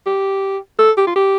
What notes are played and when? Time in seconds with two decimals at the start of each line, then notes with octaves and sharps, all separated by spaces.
0.06 G4
0.78 A4
0.97 G4
1.07 F4
1.16 G4